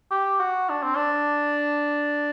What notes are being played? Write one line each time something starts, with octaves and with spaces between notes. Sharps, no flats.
G4
F#4
D4
C4
D4